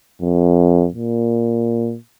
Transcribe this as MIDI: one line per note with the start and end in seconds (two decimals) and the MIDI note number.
0.22 0.88 41
0.94 1.97 46